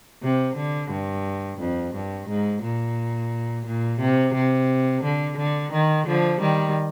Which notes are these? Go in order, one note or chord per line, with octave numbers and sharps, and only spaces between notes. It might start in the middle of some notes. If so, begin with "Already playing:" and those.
C3
D3
G2
F2
G2
G#2
A#2
A#2
C3
C3
D3
D3
D#3
D3 F3
D#3 G3